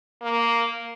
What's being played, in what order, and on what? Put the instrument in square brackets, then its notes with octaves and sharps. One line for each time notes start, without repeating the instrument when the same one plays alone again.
[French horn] A#3